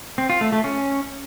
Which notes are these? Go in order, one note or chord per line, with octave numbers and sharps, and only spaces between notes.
C4
F4
A3
A3
C#4